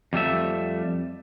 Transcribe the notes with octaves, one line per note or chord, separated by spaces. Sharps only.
F2 G3 A3 E5